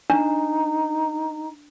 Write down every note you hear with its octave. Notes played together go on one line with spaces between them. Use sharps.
D4 D#4